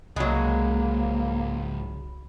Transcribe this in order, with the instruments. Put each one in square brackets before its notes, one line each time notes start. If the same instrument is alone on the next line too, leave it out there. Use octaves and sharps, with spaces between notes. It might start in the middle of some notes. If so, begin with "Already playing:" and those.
[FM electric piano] C2 B5 [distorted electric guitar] G#2 C#3 [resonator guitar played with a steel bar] F#3 G#3 [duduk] A#3